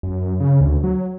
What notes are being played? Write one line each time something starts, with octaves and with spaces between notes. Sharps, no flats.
F#2
C#3
D2
F#3